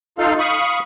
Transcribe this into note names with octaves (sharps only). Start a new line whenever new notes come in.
D#4 F4 A4 F5
F5 B5 C#6 D#6